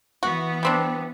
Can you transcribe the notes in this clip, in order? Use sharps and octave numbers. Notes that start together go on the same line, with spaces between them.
E3 B3 F#4
G3 C4 D4